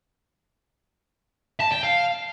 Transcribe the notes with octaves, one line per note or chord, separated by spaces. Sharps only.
A5
G5
F5